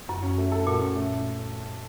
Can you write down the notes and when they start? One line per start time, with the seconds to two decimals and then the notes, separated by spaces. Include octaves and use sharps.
0.08 F#2 F#4
0.23 C#4
0.38 A3
0.52 A4
0.66 A#2 F#4
0.81 C#4
0.96 A3